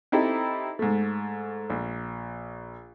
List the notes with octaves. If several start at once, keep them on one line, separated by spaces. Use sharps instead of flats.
C4 D#4 E4 G4 A4
G#2 A3
A#1